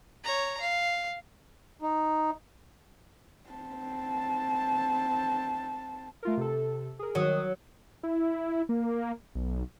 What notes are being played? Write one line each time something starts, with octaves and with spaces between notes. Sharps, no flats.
C#5 A#5
F5
D#4
C4 A5
A3 F4 A#4
C3 A4
G#4 A#4
D#3 F#3 D#6
E4
A#3
B1